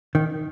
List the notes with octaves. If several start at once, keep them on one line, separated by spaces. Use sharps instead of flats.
D#3